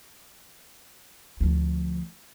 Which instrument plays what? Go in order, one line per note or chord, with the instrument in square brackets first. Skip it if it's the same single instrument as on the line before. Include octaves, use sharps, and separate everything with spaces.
[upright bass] D2 F3